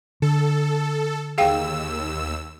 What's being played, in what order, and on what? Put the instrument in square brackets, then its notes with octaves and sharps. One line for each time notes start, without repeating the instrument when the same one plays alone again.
[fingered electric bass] D3 [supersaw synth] A4
[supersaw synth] D#2 E6 [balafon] G#4 F5 G5